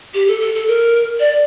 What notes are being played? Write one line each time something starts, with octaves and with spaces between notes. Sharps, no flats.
G4
A4
A4
A4
A#4
D5